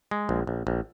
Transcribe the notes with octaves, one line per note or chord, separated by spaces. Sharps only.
G#3
A#1
A#1
A#1